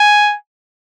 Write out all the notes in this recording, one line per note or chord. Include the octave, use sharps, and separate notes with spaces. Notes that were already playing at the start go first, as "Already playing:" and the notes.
Already playing: G#5